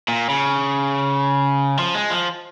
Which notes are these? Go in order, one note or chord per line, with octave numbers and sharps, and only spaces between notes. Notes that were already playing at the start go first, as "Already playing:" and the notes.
A#2
C#3
F3
G#3
F3